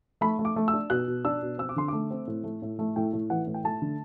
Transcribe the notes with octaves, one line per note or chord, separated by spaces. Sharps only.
A3 B5
A3
D6
A3
E6
D4
B2 F#6
B2
D4 E6
B2
C4 E6
D6
D3 C6
A3 D6
C4
A2
A3
A2
A3
A2 G5
A2
E3 F#5
A2
G5
A3 A5
D3